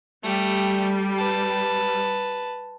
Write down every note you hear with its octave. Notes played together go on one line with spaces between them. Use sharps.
G3 A3 G4
B4 A5